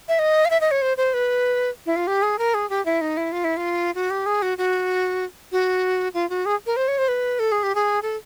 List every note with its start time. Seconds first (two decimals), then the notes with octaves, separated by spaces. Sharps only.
0.09 E5
0.19 D#5
0.45 F5
0.50 E5
0.61 D#5
0.71 C#5
0.82 C5
0.97 C5
1.14 B4
1.86 E4
1.96 F4
2.07 G4
2.22 G#4
2.39 A#4
2.54 G#4
2.70 G4
2.85 E4
3.01 D#4
3.17 E4
3.32 F4
3.44 E4
3.57 F4
3.95 F#4
4.10 G4
4.26 G#4
4.42 F#4
4.58 F#4
5.52 F#4
6.14 F4
6.30 F#4
6.46 G#4
6.66 A#4
6.76 C5
6.88 C#5
6.98 C5
7.08 B4
7.39 A4
7.52 G#4
7.63 G4
7.75 G#4
8.02 A4